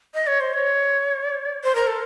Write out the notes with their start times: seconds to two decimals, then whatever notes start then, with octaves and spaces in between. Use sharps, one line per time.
0.14 D#5
0.27 C#5
0.41 C5
0.54 C#5
1.64 C5
1.75 A#4
1.87 A4